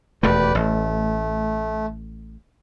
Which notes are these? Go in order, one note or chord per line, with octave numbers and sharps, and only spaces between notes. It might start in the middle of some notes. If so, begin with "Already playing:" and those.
E1 D#2 A3 G4 B4 D5
A1 A3